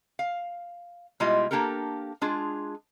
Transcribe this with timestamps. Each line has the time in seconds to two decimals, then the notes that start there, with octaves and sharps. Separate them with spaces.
0.19 F5
1.20 B2 G3 G#3 E4 F4 D#5
1.51 A#3 D4 G4 A4 A#4
2.21 G#3 D4 F4 G#4